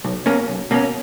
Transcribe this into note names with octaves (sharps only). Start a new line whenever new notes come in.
B1
B2 A#3 C#4
B1
B2 A#3 C#4